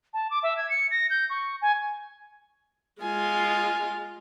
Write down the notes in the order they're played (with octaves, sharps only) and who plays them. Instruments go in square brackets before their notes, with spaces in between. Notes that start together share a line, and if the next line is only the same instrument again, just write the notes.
[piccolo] A5
D6
E5
G#6
C#7
A#6
G6
C#6
G#5
[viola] G#3 F4 [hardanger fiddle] G#5